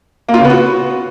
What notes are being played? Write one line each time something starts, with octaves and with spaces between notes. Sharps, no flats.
A#3
F4
C#3
B3
F#4